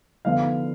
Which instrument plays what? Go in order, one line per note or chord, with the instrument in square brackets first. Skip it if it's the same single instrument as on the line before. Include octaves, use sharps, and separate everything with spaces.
[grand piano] D3 F3 B3 D4 F5